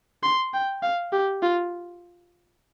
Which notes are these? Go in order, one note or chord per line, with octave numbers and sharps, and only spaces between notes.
C6
G5
F5
G4
F4